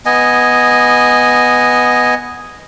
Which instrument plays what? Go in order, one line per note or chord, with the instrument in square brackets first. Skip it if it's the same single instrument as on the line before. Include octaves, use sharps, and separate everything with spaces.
[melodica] B3 D#5 G#5